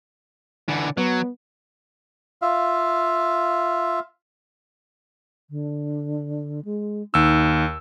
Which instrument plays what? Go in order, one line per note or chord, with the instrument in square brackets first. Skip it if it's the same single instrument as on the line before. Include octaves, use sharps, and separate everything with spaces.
[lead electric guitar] D3 E3
[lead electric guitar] F#3 [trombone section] B3
[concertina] F4 E5 F5
[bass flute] D3
G#3
[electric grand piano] D#2 E6 [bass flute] D#4